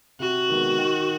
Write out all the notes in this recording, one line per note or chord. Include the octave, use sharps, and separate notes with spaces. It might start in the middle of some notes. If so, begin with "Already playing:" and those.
C3 F#4
D#3 G#3 B3
D#3